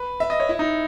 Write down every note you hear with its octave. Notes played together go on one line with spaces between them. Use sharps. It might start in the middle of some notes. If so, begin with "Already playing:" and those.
Already playing: B4
E5
D#5
C#5
E4
D#4